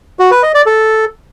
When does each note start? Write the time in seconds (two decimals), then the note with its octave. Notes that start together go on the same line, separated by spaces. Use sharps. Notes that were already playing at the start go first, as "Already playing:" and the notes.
0.19 F#4
0.31 B4
0.43 D#5
0.54 D5
0.66 A4